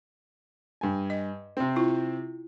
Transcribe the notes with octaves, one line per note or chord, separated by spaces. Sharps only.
G2 G#5
D#5
C3 C4
E4 F4